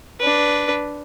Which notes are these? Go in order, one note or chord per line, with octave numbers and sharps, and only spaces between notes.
D4 B4